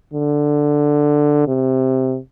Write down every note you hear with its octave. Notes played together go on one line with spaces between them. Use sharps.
D3
C3